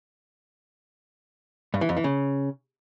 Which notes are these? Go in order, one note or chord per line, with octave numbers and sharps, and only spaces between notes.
G2
E3
F2
E3
C#3